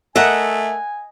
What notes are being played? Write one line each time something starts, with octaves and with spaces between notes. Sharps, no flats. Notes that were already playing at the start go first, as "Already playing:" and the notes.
A3 A#4 D#5 E5 F#5 G#5